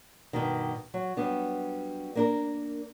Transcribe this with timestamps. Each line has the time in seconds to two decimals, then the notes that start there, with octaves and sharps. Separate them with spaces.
0.33 G2 B2 D#3
0.94 F#3
1.17 F#3 G3 B3 D4
2.15 A#3 D4 A#4